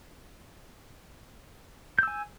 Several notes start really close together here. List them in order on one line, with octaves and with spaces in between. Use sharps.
G6 E6 G#5